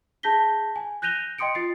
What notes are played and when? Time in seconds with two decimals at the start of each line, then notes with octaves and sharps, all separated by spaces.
0.23 G#4 A5 G6 A#6 B6 G7
0.76 G#5
1.02 F#6 G6 A#6 D#7 F7 G7
1.38 D#5 G5 C6 D#6 C#7 D7
1.55 F4 A6 C7